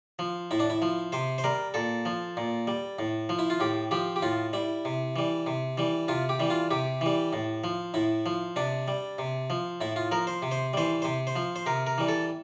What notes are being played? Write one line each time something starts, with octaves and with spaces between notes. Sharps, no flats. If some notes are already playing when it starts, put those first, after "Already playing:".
F3
A2 E4
D4
E4
F3
C3 C5
C5
G3 A#4
A#2 A4
F3
A#2
G3
A2
F3
E4
F4
A2 G4
F3 G4
G4
A2 F4
G3 E4
C3
E3 G3
C3
E3 G3
C3 F4
G4
E3 G3
F4
C3 G4
E3 G3
A2
F3
A2 E4
F3
C3 D4
G3
C3
F3
A2 E4
F4
F3 A#4
C5
C3
C5
E3 G3 C5
C3 C5
C5
F3
C5
C3 A#4
A#4
E3 G3
A4